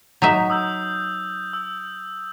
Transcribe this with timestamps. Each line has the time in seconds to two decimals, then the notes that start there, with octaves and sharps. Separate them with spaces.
0.22 F#3 D#4 E5
0.50 D#6 E6 G6
1.53 E6